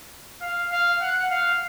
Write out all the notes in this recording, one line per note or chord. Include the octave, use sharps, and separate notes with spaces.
F5
F5
F#5
F5